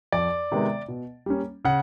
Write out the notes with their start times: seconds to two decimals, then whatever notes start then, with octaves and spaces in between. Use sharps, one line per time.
0.12 F2 D5
0.52 C3 D#3 G#3 B3
0.88 B2
1.26 G3 A#3 C#4
1.65 C#3 F#5